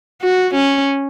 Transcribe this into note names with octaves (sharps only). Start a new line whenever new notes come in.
F#4
C#4